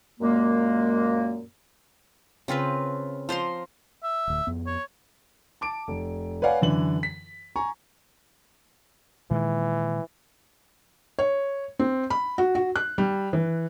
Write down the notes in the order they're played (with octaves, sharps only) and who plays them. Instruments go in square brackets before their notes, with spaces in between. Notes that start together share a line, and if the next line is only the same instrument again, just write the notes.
[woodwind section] F#2 A#2 G#3 A#3
[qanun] C#3 C4 F4 B4
F3 C5 A#5 C6
[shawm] E5
[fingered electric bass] D1 D2
F2 B3
[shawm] C#5
[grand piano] A5 D6 D7
F1
B4 C#5 D5 F5 F#5 G#5
F#2 D3 E3 F#7
B6
G#5 A#5 C#6
[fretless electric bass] A#2 D#3 G#3 [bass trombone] E3
[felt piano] C#5
C4
B5
F#4
F#4
F#6
G3
E3